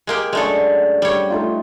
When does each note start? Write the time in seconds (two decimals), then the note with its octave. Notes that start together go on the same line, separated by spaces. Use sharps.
0.07 G#3 A#3 G4
0.33 F#2 G#3 A3 D4 A4 C#6
1.02 G3 C#5
1.30 A3 D#4 F4